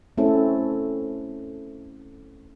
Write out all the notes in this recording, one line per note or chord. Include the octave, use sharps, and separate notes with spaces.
A3 C4 C#4 E4 A4